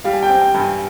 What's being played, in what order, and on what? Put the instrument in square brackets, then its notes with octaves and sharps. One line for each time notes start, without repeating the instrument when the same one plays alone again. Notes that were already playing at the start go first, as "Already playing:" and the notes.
[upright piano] G3 [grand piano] F5
[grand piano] G#5
G5
[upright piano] C4
[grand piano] G5
[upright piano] G2
[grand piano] G#5